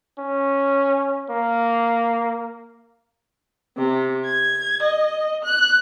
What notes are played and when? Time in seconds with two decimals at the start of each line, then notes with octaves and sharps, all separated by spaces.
0.19 C#4
1.30 A#3
3.77 C3
4.26 G#6
4.84 D#5
5.45 F#6